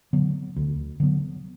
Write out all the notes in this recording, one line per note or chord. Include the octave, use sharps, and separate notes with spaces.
D3 F#3 B3
D2
D3 F#3 B3